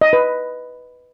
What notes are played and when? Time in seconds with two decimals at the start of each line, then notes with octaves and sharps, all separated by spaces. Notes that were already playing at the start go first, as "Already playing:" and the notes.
0.01 D#5
0.13 B4